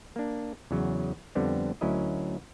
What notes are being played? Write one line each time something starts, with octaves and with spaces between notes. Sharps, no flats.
A#3 D4
E2 C#3 F#3
F2 D3 G3 B3 C4
D2 F#3 C#4 E4 A#4 D#5